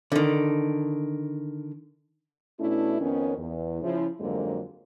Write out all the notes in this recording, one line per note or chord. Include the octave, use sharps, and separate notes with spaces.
D3 D#3
B2 A3 C#4 D4 E4
F2 D#3 B3 C#4
E2
C#3 F3 E4
F2 G#2 D3 F#3 G#3 A#3